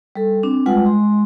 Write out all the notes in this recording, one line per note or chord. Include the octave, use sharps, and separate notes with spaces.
G3 A4
C4 D4
G3 G#3 F4 B4 F#5
G#3 C6